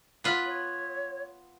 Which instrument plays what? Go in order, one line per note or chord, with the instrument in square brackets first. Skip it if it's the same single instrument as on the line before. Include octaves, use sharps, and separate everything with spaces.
[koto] B3 F4 B4
[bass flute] C#5